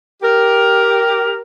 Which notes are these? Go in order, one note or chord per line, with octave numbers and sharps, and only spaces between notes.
G4 A#4